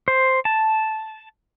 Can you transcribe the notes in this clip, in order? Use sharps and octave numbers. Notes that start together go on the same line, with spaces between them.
C5
A5